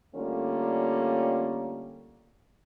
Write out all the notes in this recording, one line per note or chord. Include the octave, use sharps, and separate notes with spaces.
D3 G3 A3 A#3 C#4 F4